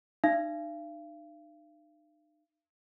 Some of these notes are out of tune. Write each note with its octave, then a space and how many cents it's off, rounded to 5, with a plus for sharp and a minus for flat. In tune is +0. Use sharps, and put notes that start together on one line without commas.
D#4 -40 F5 -40